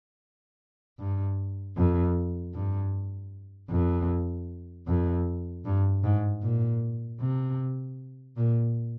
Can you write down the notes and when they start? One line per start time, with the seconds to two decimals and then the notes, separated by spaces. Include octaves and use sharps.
0.99 G2
1.77 F2
2.54 G2
3.70 F2
4.87 F2
5.65 G2
6.04 G#2
6.42 A#2
7.20 C3
8.37 A#2